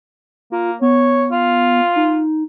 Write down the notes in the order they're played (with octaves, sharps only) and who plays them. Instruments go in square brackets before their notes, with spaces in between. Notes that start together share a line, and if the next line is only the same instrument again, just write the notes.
[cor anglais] A#3 [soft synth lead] F4
[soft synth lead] B3 [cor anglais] C#5
[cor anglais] F4
[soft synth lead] D#4